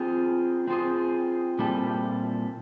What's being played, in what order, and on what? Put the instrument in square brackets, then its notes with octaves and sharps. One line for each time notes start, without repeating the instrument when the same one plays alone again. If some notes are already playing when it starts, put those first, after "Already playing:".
Already playing: [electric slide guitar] C4 F4 G#4
C4 F4 G#4
A#2 G3 C4 E4 A4